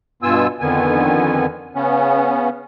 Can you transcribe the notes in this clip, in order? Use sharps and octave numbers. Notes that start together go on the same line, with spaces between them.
G2 B2 B3 F4 G#5 E6
F2 D3 D#3 B3 G#5
C#3 B3 C#4